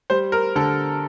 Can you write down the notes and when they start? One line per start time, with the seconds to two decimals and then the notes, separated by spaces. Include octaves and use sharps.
0.10 G3 C5
0.32 A#4
0.56 D3 A4